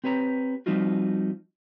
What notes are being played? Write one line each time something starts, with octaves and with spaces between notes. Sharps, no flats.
C4 G4 B4 C#5 A#5
F3 G3 C4 D#4 F4 F#4